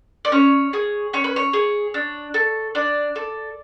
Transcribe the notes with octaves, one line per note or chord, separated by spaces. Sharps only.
D5
C#4 C#5
G#4
C#4 C#5
B4
C#5
G#4
D4
A4
D4 D5
A4